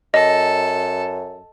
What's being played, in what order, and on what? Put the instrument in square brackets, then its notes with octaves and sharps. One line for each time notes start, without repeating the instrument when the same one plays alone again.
[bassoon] F#2 [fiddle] A4 [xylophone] D#5